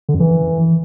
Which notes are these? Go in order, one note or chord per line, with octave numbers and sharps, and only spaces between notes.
D3
F#2
E3